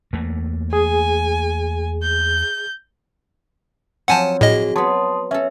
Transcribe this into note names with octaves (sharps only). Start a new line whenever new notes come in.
E2 A3 A#3
G#4 G#5
G6
F3 F#3 C4 F#5 G#5 A5
A2 F#4 G#4 D#5
F#3 B3 A5 C6 D#6
C#4 A4 E5